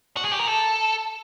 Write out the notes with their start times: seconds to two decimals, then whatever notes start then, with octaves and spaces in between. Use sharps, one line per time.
0.17 F#4
0.25 G#4
0.32 G4
0.40 A#4
0.48 A4